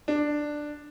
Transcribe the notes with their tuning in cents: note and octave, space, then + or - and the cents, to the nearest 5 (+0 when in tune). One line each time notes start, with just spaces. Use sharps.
D4 +10